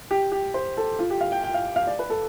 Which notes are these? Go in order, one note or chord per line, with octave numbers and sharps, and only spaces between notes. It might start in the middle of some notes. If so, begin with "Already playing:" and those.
G4
G4
C5
A4
F4
G4
F5
G5
G5
F5
F5
D5
B4
A4